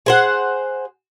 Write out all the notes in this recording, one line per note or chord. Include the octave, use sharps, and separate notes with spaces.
G#4 C5 F#5